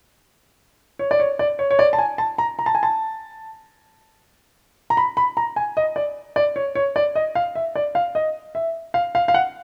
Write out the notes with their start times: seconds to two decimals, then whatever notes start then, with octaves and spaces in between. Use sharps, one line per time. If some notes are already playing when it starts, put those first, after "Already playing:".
0.99 C#5
1.11 D5
1.20 C#5
1.39 D5
1.59 C#5
1.71 C#5
1.79 D5
1.93 A5
1.99 G#5
2.18 A5
2.38 A#5
2.59 A#5
2.66 A5
2.75 G#5
2.83 A5
4.90 A#5
4.97 B5
5.17 B5
5.37 A#5
5.56 G#5
5.77 D#5
5.96 D5
6.36 D5
6.56 C#5
6.75 C#5
6.96 D5
7.15 D#5
7.35 F5
7.55 E5
7.75 D5
7.95 F5
8.15 D#5
8.55 E5
8.94 F5
9.15 F5
9.28 F5
9.34 F#5